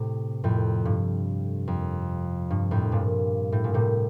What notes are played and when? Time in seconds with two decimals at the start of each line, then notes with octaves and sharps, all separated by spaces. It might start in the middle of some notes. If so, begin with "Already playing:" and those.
Already playing: A2 C3
0.44 F2 A2
0.85 G2
1.68 F2
2.50 G2
2.71 F2 A2
2.92 G2 A#2
3.52 A2
3.64 A#2
3.74 A2 C3